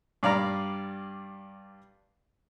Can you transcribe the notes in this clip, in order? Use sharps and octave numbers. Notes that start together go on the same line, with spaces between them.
G2 D5 F5 A#5 B5